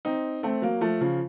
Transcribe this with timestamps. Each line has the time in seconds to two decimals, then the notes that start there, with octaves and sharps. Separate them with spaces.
0.05 C4 D#4
0.43 A3 C4
0.62 F#3 A#3
0.81 F3 A3
1.01 C#3 F3